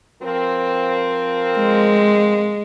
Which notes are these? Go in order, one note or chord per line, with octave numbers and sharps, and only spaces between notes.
F3 C4 A#4
G#3